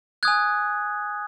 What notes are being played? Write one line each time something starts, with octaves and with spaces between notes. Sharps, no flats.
G#5 D#6 F#6 G#6